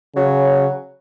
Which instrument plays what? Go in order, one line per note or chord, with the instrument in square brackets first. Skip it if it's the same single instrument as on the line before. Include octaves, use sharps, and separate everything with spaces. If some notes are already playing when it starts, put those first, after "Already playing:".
[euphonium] C#3 [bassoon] F#3